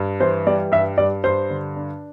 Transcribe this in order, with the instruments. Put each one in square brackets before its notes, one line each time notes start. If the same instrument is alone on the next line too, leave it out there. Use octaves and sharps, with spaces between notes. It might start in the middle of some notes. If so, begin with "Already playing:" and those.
Already playing: [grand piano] G2
[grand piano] E3 [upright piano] C5
[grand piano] G3 [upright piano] D5
[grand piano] G2 [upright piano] E5
[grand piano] G2 [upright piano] D5
[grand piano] G2 [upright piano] C5
[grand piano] D3
D4